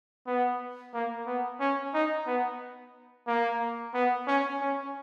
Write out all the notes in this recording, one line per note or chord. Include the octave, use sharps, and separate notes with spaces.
B3
A#3
B3
C#4
D#4
B3
A#3
B3
C#4
C#4